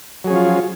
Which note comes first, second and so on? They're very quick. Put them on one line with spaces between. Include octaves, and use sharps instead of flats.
F#3 G#4 C#4 F3 F4